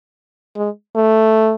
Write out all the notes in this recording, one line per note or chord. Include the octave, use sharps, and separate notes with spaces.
G#3
A3